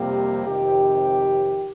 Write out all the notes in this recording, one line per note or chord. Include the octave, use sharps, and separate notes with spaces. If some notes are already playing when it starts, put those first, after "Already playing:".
Already playing: F2 C3 G3 A#3 G4
F2 C3 D#3 G4